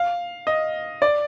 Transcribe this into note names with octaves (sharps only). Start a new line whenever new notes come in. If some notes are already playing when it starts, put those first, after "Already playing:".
Already playing: F5
D#5
D5